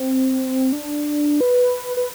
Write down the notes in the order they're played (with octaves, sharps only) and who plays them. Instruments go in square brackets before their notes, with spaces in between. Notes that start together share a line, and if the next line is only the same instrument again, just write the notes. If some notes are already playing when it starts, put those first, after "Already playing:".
Already playing: [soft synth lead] C4
D4
B4
B4